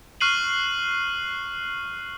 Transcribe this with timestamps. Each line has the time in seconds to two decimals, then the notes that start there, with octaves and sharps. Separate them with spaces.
0.21 C#6 F6 F#6 C7 D#7 F#7